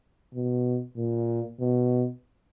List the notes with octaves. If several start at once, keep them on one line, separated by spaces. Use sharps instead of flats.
B2
A#2
B2